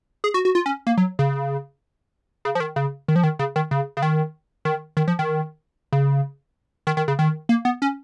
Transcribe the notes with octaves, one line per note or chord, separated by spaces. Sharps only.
G#4
F#4
F#4
F4
C#4
A#3
F#3
C#3
C#3
F3
D#3
C#3
D#3
F3
D#3
C#3
D#3
C#3
C#3
D#3
D#3
D#3
F3
D#3
C#3
D#3
D#3
C#3
D#3
A#3
B3
C#4